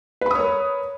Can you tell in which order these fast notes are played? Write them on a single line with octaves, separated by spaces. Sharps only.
B4 B5 D#6 C#5 A#4